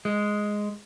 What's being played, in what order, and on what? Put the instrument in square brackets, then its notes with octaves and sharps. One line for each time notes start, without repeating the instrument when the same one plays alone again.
[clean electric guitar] G#3